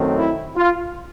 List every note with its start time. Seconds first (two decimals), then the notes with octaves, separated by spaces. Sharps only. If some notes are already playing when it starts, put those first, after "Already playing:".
Already playing: F#2 D#3 F#3 A3 C4
0.16 E4
0.57 F4